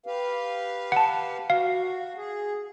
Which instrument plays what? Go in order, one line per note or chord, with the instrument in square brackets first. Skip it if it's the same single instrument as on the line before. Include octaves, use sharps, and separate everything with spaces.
[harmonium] G4 B4 F5
[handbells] F#5 A5
[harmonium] F#4 [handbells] F5
[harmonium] G#4